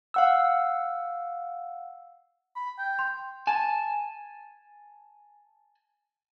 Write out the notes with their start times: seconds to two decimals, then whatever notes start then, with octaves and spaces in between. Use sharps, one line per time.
0.14 F5 F#5 E6
2.56 B5
2.78 G5
2.99 C6
3.47 G#5 A5